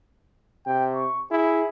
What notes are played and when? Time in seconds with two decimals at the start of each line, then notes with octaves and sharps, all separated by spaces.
0.67 C3 G5
0.95 C#6
1.31 E4 G#4